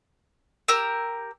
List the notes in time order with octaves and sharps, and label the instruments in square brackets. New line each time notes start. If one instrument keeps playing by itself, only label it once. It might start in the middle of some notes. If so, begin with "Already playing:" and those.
[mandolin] G4 A#4 E6